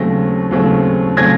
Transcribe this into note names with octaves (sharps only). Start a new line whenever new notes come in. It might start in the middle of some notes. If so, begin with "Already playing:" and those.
Already playing: D#2 C#3 F#3 A3 C4 A#6
D#2 C#3 F#3 A3 C4
C#3 F#3 A3 C4 G#6 A#6